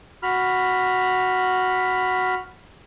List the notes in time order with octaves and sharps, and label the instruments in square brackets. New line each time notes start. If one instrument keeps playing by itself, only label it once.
[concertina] F#4 B5 F6